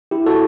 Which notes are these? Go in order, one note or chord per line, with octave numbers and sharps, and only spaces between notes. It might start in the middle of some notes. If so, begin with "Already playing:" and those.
E4 G4
F#4 A4